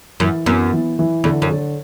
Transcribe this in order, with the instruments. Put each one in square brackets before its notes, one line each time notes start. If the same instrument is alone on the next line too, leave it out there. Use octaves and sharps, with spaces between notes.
[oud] F#2 [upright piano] E3
[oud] F#2 [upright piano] B3
[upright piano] E3
E3
[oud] E2 [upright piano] D3
[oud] F#2
[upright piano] D3